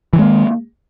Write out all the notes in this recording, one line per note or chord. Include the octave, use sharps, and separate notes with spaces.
D#3 E3 G#3 A#3